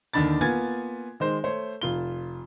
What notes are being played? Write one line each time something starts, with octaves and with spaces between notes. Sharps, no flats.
D#2 D3 D#3 D4 B5 A6
A#3 B3 F4 G#5 G#6 A6
D#3 G#3 C5
A3 C5 C#5
F1 F4 G7